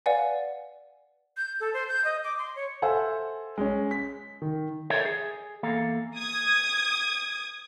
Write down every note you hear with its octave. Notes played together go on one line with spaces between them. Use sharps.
B4 D5 F5 F#5 G#5
G6
A4
C5
G6
D#5
D6
C6
C#5
A4 C5 E5 F#5 G#5
G#3 C#4
B6
D#3
A4 A#4 C5 C#5 D#5 E5
G#4
E2 A#3 A4 F5
D#6 G#6